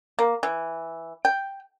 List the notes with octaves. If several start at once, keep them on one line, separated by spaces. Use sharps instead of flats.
A#3
E3
G5